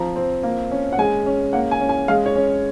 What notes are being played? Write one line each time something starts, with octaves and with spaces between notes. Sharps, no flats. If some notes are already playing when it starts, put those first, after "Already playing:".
Already playing: F3 C4 A#5
C4
A#3
C#4
F#5
G#3 G#5
C#4
A#3 F#5
G#5
C#4
G#5
G#3 F5
C#5
C#4